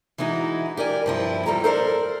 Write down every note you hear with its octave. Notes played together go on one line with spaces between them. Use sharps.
E3 G#3 D#4 E4 F#4
G4 A#4 D5 G#5
G2 F3 E4
E2 B2 G3 A4 A#5
A4 A#4 C5 D5